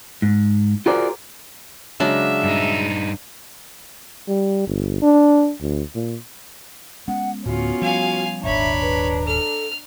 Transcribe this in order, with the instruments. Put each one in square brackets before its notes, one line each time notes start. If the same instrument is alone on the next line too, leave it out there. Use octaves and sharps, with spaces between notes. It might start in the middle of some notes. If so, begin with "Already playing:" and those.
[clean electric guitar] G#2
F4 F#4 G#4 A#4 C5 D5
[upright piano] C#3 F#3 G#3 [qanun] D4 [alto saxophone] E5
[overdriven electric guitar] G2 D#4
[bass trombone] G3
G1
D4
D2
A#2
[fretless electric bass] G#3 B3 C#4 [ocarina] F#5
[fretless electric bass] D2 A2 [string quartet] B3 C#4 F4 [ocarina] F#4
[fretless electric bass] F3 G3 [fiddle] F5 G#5
[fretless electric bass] D#1 G#1 D#2 [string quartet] D4 A#5 [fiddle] C#5 B5 [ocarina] E5
[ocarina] B4
[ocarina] A4 [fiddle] F6